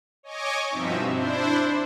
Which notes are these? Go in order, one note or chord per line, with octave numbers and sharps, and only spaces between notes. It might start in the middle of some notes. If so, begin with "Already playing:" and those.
C#5 D#5 G#5 C#6 D6
G2 B2 F3 C4 D#4 E5
D4 E4 C5